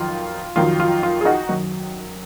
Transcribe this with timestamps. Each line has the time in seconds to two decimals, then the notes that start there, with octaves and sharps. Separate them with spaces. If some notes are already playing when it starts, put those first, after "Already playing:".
Already playing: F2 D#3 F#3 F4
0.56 F2 D#3 F#3 F4
0.80 F4
1.03 F4
1.21 G#4
1.25 D#4 F#4
1.49 F#2 D#3 F#3